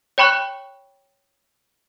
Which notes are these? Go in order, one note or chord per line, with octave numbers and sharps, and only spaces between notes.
C#5 G5 B5 C#6 F#6